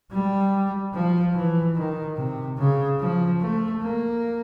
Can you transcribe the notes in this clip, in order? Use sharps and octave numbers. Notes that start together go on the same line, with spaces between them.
G3
F3
E3
D#3
C3
C#3
F3
A3
A#3